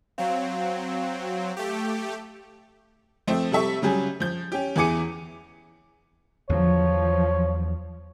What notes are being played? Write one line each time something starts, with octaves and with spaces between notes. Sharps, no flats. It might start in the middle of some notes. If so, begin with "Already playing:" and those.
F#3 C4 F5
A3 G4
F3 A3 C4
C3 G3 A4 E5 C#6
C#3 F#3 G3 G#4
F3 G6
C#4 G4
E2 E3 G#4 D6 C#7 D#7
E2 D3 F3 F#3 C#5